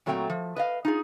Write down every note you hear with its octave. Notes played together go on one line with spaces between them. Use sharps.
A#2 F#3 A3 C4 G5 A#5
F3
B4 D#5 F5
D#4 F4 G#4